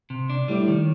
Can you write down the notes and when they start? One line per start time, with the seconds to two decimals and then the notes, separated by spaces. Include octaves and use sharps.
0.10 C3
0.30 D4
0.48 A2 G3
0.68 D#3